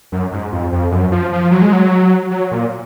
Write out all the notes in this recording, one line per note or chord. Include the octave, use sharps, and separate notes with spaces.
F#2
G#2
F2
F2
F#2
F3
F3
F#3
G#3
F#3
F#3
A#2